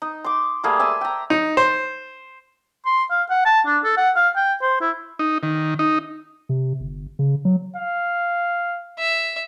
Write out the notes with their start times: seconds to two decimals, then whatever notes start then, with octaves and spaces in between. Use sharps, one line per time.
0.02 D#4
0.24 C6 D6
0.64 G3 A3 A#3 G#4
0.79 E5 G#5 A5 C6
1.01 G5 A#5
1.30 D#4
1.57 C5
2.86 C6
3.10 F5
3.30 F#5
3.45 A5
3.67 D4
3.85 A4
3.97 F#5
4.16 F5
4.36 G5
4.62 C5
4.81 E4
5.19 D#4
5.43 D#3
5.79 D#4
6.49 C3
6.80 G1
7.19 C#3
7.45 F#3
7.76 F5
8.99 E5